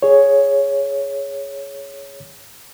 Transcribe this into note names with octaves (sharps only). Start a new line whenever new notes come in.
G#4 C#5